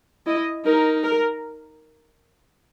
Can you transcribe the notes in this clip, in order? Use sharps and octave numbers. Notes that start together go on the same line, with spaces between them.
E4 D#5
D#4 A#4
A#4